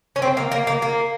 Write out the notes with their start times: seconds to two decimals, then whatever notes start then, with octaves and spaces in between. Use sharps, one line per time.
0.16 C#4
0.22 C4
0.37 A#3
0.52 A#3
0.67 A#3
0.82 A#3